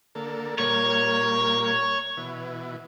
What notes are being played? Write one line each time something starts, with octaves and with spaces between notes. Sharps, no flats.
D3 A#3 A4
A#2 G3 A#3 C#5
B2 E3